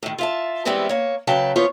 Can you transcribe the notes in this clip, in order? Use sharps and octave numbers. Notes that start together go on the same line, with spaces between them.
A2 D#3
F4 E5 A5
E3 G3 G#3 B3 C4 E4
A#3 C#5
C#3 F#3 B4 G5 A5
E3 F3 B3 F4 C5 C#5